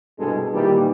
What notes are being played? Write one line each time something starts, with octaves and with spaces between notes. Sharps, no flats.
C2 G2 B2 G#3 A4
A#2 D#3 E3 G3